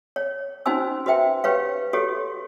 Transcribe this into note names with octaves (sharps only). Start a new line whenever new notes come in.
C#5
C#4 D#4 F#4 C5 G#5 E6
F#4 B4 C5 E5 G5
G4 B4 C#5 F5
F#4 G4 A4 C#5